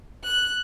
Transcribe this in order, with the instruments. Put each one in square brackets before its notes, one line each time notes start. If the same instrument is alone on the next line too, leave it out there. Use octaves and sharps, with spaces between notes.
[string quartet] F#6